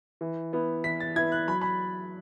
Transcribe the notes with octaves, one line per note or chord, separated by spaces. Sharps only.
E3
B3 E4
E3 B6
A6
B3 E4 G#6
F#6
F#3 B5
B5